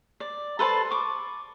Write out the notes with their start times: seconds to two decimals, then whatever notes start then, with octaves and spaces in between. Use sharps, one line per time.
0.20 D5
0.59 A4 B4 C5 A5
0.91 C#6 D6